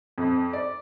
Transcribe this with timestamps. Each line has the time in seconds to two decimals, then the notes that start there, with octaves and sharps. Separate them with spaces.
0.18 F2
0.53 D5